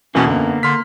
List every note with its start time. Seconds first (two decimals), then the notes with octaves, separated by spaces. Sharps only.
0.15 E2 B2 E3 A#3 C#4
0.26 F#2 D3 B3
0.63 D3 C6 F6 B6